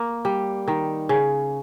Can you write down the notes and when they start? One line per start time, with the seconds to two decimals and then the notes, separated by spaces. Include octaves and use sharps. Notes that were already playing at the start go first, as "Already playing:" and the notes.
Already playing: A#3
0.25 G3
0.68 D#3
1.09 C#3